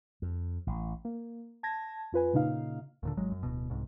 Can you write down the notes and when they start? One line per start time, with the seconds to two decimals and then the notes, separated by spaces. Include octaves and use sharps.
0.22 F2
0.67 A1
1.05 A#3
1.63 A5 G#6 A#6
2.12 F2 F4 B4 G#5
2.33 A#2 C#3 D#4 F5
3.03 D#2 A#2 D3
3.17 G#1 F#3 G#3
3.32 F#2
3.43 D1 B2
3.70 C2 G#2